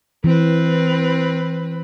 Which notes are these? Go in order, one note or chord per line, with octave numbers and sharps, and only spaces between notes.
E3 C4 B4